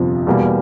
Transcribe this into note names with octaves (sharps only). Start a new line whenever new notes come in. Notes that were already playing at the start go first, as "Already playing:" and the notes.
Already playing: G1 F2 C3 F3
E2 B2 G3 A#3